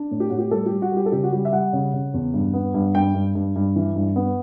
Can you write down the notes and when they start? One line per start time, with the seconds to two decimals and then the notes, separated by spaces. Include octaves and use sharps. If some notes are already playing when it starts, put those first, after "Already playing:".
Already playing: D4
0.11 A2
0.20 G4
0.30 A2 F#4
0.39 G4
0.51 G3 A4
0.66 G4
0.71 G3
0.82 F#4
0.92 G3 G4
1.06 A4
1.12 C#3 G4
1.24 F#4
1.32 G3 G4
1.45 E5
1.53 G3 F#5
1.73 C#3
1.94 C#3
2.14 E2
2.34 G2
2.53 B3
2.74 G2
2.95 G2 G5
3.15 G2
3.35 G2
3.56 G2
3.76 E3
3.96 G2
4.16 B3